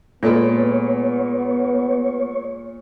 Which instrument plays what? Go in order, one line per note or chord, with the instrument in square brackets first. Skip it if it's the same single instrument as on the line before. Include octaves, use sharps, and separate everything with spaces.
[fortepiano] A#2 [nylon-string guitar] G#3 A4 B4 [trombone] B3 [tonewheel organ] C#5